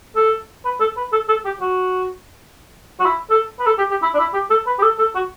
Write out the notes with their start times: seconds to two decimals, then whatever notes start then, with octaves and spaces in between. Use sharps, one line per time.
0.16 A4
0.65 B4
0.80 A4
0.97 B4
1.12 A4
1.28 A4
1.45 G4
1.60 F#4
3.00 F#4
3.05 E4
3.30 A4
3.59 B4
3.66 A4
3.78 G4
3.91 G4
4.02 E4
4.14 D4
4.19 E4
4.34 G4
4.50 A4
4.67 B4
4.79 G4
4.82 A4
4.98 A4
5.15 F#4